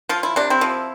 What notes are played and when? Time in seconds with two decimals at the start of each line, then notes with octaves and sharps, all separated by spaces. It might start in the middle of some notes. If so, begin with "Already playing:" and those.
0.09 F3 F4
0.23 E4
0.36 C3 D4
0.50 C4 E4
0.61 F3